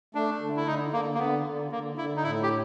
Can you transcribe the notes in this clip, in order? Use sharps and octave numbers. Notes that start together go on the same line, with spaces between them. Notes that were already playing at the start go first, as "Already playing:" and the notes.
A3 D4
D3
E4
D3 D#4
D3 A#3
A#3
D3 B3
D3
D3 A#3
D3 E4
D#4
A2 E4
G4